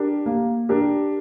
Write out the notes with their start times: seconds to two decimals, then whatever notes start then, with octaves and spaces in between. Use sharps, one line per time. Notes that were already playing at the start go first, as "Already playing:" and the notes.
Already playing: D4 G4 A#4
0.26 A#3
0.69 D4 G4 A#4